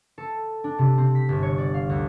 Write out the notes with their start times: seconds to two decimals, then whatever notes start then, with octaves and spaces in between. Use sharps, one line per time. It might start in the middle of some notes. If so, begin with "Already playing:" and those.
0.18 A4
0.64 D4
0.79 C3
0.97 C4
1.15 B6
1.29 G1
1.43 C#5
1.58 D5
1.74 F5
1.90 D2